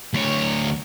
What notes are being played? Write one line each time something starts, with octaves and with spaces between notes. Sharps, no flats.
D2 C#5